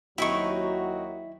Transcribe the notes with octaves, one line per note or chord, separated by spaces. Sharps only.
D#2 F#3 C4 D#4 E4 F#4 C#6